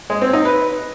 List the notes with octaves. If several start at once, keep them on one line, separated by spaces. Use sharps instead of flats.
G#3
C4
D#4
B4